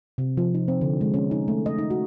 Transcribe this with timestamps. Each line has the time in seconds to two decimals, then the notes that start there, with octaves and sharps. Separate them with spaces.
0.18 C3
0.37 F3
0.54 D#4
0.68 C4
0.81 D3
1.01 G#3
1.14 C#4
1.31 D#4
1.48 A3
1.66 D#5
1.78 D#4
1.90 F#4